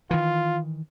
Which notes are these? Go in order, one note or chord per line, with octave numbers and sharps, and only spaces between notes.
D#3 E3 F4